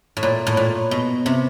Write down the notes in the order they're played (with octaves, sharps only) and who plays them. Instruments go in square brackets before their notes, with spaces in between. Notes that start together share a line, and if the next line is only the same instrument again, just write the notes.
[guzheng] A2
A#2
A2
A#2
B2
C3